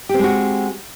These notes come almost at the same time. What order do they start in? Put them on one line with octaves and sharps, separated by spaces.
G4 C4 G#3 F#4